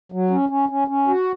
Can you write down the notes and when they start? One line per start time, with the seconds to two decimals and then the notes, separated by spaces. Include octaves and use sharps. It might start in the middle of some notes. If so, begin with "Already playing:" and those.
0.12 F#3
0.30 C#4
0.49 C#4
0.69 C#4
0.88 C#4
1.08 F#4